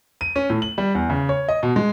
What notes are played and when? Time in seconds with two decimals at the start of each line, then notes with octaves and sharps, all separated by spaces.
0.21 D#7
0.36 C#4
0.50 A2
0.62 F#7
0.78 G3
0.95 E2
1.10 C#3
1.29 C#5
1.48 D#5
1.63 B2
1.76 G#3